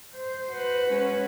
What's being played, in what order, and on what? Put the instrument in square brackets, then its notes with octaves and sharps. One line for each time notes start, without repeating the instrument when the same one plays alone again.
[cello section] C5
[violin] F#4 B4
[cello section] G#3 C#4